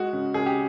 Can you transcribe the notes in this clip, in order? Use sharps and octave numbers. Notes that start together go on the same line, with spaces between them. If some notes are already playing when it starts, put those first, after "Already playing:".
Already playing: G#3 F#4
C#3
C#3 G#4
G4